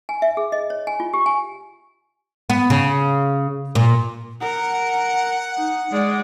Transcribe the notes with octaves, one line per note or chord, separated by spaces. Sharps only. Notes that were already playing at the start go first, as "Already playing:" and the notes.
G#5
E5
G#4
D#5
C#5
G#5
F4
G4
G#5
B3
C#3
A#2
A#4 F#5
D#4
G#3 D5